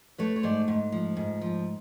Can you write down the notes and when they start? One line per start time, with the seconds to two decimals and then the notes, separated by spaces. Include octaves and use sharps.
0.18 A3 B4 C#5
0.36 C#5
0.43 G#2 C5 D5
0.68 G#2
0.92 F3
1.17 G#2
1.41 F3